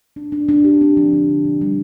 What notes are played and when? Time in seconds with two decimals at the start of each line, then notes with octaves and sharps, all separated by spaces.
0.16 D4
0.32 D4
0.48 D4
0.64 G4
0.81 C4
0.97 F3
1.13 D3
1.29 D3
1.45 B2
1.61 G3